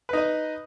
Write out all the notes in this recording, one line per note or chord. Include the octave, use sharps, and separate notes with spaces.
D#4 B4 D#5